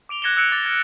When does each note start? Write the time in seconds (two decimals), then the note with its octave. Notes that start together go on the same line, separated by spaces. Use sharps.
0.09 D6 D7 F7 G7
0.22 F#6 G#6 A#6 C#7 E7 G7
0.37 E6 F#6 G#6 C#7 D7 E7
0.52 D6 A6
0.65 F6 G#6